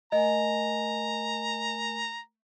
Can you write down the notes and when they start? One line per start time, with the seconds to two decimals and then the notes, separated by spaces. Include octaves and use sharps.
0.12 A3 A#4 D#5 G#5 A#5